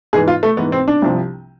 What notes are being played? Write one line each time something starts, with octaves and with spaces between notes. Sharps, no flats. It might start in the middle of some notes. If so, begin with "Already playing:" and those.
G#2 E3 G#4
F4
A3
G#2 E3 B3
C4
D4
C2 C3 F3